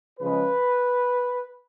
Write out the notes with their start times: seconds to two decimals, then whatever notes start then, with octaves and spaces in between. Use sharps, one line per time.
0.20 C#3 F3 G#3 B4